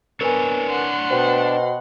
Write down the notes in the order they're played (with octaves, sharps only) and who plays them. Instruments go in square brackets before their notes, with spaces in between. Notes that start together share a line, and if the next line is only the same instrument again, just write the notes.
[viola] B3 [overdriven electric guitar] D4 C#5 [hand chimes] A#4 B4 G#5
[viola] F#5 C6
[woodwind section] B2 [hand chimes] C5 G5